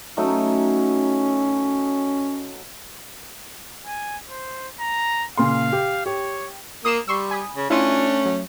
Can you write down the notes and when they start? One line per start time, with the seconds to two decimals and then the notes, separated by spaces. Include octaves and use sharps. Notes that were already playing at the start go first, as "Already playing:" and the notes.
0.17 F#3 A3 C#4 D#4
3.86 G#5
4.29 C5
4.79 A#5
5.37 A#2 C#3 F5 C6
5.72 G4
6.06 G4 C#5
6.85 A#3 D#6 C7 E7
7.08 G3 C6 C#6 E6
7.31 G#5 B5 D#6
7.55 C#3
7.70 A3 C#4 D4 E4 F4 D#7
8.25 F#3